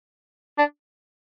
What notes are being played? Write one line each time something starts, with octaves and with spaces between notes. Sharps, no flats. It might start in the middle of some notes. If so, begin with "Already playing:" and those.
D4